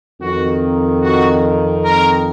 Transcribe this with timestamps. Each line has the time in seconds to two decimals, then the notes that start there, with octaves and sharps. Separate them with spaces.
0.20 F2 D#3 F#4
1.02 F#4
1.84 A#4